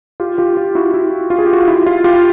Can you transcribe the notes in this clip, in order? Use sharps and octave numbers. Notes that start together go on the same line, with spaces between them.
F4 G4
F4 G4
F4
E4 F#4
E4
F4
G#4
G4
F#4
F4
E4
F4
F4 G4